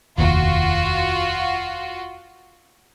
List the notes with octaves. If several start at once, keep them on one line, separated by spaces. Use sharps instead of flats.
F1 D#2 F4 F#4